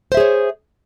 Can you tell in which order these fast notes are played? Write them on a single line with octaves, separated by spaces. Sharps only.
C5 E5 G#4 C#5